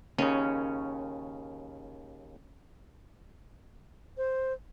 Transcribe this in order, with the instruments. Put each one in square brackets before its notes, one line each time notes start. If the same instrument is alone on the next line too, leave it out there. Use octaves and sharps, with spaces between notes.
[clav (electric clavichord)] D#2 C#3 [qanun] C#4
[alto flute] C5